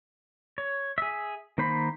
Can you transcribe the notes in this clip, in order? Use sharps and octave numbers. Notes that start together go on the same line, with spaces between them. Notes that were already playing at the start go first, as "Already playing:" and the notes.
C#5
G#4 E5
D#3 A#3 C5 B5